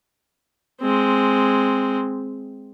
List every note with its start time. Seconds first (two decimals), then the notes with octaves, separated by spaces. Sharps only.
0.81 G#3 C4